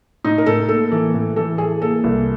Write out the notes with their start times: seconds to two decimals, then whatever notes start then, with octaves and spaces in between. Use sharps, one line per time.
0.24 A2 D#4
0.38 A#4
0.46 A2 A4
0.69 A#3 A4
0.91 E3 A4
1.14 A2
1.36 E3 A4
1.58 E3 G#4
1.81 A#3 A4
2.04 C2